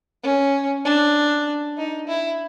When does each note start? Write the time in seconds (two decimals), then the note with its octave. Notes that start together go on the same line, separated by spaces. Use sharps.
0.23 C#4
0.85 D4
1.77 D#4
2.08 E4